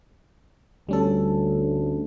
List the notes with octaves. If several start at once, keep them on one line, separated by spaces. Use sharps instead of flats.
D2 G3 C#4 A4